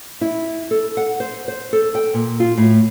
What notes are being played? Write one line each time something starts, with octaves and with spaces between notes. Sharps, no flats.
E4
A4
F#5
C5
C5
A4
G5
A#2
F4
A2